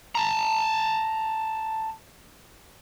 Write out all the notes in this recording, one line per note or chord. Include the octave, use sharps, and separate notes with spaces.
A5 A#5